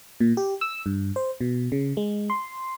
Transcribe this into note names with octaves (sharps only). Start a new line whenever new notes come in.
A#2
G4
E6
G2
C5
B2
C#3
G#3
C6